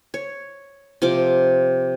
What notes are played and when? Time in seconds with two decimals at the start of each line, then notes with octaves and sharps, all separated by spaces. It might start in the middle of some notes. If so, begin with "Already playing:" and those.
0.14 C#5
1.02 C3 F3 D6